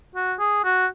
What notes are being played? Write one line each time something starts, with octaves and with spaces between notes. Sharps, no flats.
F#4
G#4
F#4